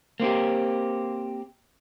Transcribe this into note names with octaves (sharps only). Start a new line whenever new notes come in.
A#3 C4 F#4 G4